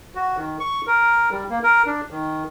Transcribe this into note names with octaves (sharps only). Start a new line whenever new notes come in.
F#4
D#3
C#6
A#4
G3
A#3
A#4
D4
D#3